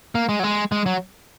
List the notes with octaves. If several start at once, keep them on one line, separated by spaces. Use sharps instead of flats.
A#3
G#3
F#3
G#3
G#3
F#3